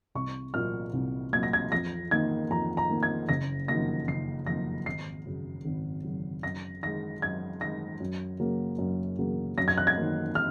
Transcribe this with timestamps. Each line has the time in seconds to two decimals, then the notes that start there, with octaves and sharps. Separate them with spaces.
0.15 C2 C#6
0.54 A#2 F#3 A#3 F6
0.93 C2
1.33 A#2 F#3 A#3 G#6
1.43 A#6
1.53 G#6
1.71 F2 A#6
2.11 D#3 A#3 G#6
2.50 F2 A#5
2.77 A#5
2.89 D#3 A#3
3.03 G#6
3.29 F#1 A#6
3.68 F2 D#3 F#3 A#3 A#6
4.07 F#1 C7
4.47 F2 D#3 F#3 A#3 A#6
4.86 G#1 C7
5.25 F#2 C#3 F#3
5.65 G#1
6.04 F#2 C#3 F#3
6.43 F#2 A#6
6.83 D#3 G#3 A#6
7.22 F#2 G#6
7.61 D#3 G#3 A#6
8.00 F#2
8.39 C#3 F#3 A#3
8.78 F#2
9.19 C#3 F#3 A#3
9.57 F#2 A#6
9.68 G#6
9.78 F#6
9.87 G#6
9.97 D#3 F#3 A#3
10.35 F6